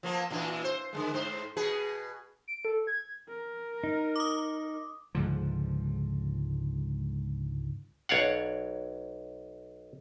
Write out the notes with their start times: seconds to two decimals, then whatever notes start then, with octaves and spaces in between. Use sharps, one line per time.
0.03 F3 A#3 B3
0.30 A#2 E3 D4
0.64 C5
0.93 D3 G3 G#3
1.14 G#2 C5
1.57 B2 G#4 B4
2.48 D7
2.65 A4
2.87 G#6
3.28 A#4
3.84 D#4
4.16 D6 D#6
5.15 C#2 G#2 D3 F3
8.09 B1 C#5 D5 F5 F#5